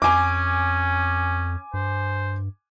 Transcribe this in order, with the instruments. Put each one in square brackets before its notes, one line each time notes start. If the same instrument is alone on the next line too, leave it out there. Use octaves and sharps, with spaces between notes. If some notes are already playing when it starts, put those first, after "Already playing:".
[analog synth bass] F2 [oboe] C#4 [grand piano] G#5 D6
[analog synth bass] G2 [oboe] C5